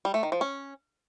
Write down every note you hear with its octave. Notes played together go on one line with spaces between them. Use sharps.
G3
A3
D#3
F3
C#4